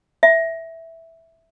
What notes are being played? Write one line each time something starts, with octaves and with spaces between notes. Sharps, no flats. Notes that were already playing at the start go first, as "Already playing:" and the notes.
E5